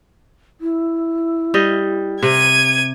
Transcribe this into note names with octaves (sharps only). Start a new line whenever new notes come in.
E4
G3 D#5
C3 G#6 D#7